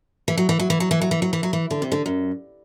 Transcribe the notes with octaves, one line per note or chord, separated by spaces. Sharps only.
E3
F#3
E3
F#3
E3
F#3
E3
F#3
E3
F#3
E3
F#3
E3
D3
C3
D3
F#2